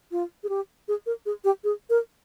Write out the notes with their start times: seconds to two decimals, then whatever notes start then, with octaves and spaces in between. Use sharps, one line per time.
0.12 F4
0.43 G#4
0.49 G4
0.88 G#4
1.06 A#4
1.26 G#4
1.44 G4
1.64 G#4
1.90 A#4